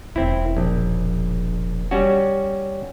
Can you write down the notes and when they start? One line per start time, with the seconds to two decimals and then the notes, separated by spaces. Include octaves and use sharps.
0.16 E1 C#3 C4 E4
0.57 A#1
1.91 G3 C#4 F#4